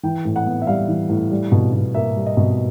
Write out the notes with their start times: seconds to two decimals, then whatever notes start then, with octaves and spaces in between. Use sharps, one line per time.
0.03 E3 G5
0.25 A2
0.36 F#5
0.46 B3
0.62 E5
0.67 G3 F5
0.88 E3
1.09 A2
1.30 G3
1.52 B2
1.73 B2
1.94 A#3 E5
2.16 G3
2.26 D#5
2.37 B2